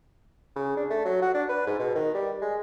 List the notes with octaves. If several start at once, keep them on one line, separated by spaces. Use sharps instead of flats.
C#3
D4
A3
F#3
F#4
D4
B4
G#2
B2
D#3
G3
G#3